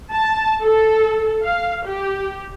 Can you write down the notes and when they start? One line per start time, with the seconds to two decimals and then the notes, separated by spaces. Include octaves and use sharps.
0.12 A5
0.62 A4
1.43 F5
1.85 G4